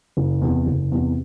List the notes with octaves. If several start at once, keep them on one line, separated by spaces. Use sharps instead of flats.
F#1
E2 C3
F#1
E2 C3